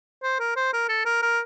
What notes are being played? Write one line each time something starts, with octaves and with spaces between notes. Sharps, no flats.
C5
A#4
C5
A#4
A4
A#4
A#4